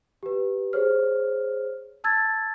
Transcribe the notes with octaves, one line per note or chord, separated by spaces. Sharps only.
G4 B4
G#4 C5 C#5 F6
A5 E6 G#6 A6